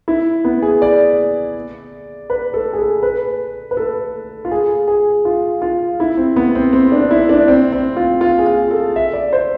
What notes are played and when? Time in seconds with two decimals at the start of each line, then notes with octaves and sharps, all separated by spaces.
0.08 E4
0.45 B3
0.62 G#4
0.82 D5
2.30 B4
2.54 A4
2.73 G#4
2.79 A4
3.03 B4
3.71 B4
3.77 A4
4.45 F4
4.52 G#4
4.88 G#4
5.25 F4
5.62 F4
6.00 E4
6.17 C4
6.36 B3
6.55 C4
6.73 C4
6.92 D4
7.11 E4
7.29 D4
7.48 C4
7.72 C4
7.97 F4
8.21 F4
8.39 G#4
8.46 F4
8.71 A4
8.96 E5
9.13 D5
9.33 C5